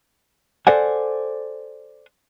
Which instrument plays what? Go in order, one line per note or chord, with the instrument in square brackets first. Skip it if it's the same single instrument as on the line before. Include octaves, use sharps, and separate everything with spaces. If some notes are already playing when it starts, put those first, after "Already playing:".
[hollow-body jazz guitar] A4 C5 D5 F#5 G#5